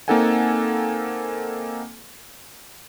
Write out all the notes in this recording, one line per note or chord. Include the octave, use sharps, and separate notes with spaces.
A#3 C4 D#4 A4 F#5 G#5